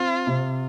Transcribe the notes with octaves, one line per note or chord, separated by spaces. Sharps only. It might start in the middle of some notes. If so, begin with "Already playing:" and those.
Already playing: C4 F4
C3